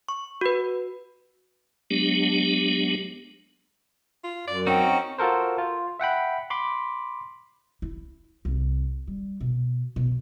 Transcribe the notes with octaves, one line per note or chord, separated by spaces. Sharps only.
C#6
F#4 B4
F#3 G#3 B3 D4 G4
F4
F#2 D5
C4 C#4 D#4 F#4 G5
F4 F#4 A4 A#4 C5
F4
E5 F#5 G5 B5
B5 C6 D6
E4
C2
G3
B2
B2